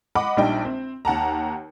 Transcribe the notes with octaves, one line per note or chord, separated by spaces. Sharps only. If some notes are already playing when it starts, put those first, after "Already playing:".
D#5 F#5 B5 D6
A#1 G3 D4 D#4 G5
C4
D#2 F#5 A5 A#5